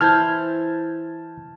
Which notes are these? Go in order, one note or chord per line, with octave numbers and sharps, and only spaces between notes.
E3 E4 C5 A5 F6 G6 G#6